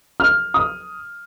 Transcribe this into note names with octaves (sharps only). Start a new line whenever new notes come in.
F6
D#6